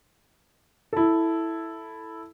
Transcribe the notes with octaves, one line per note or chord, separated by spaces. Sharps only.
E4 A4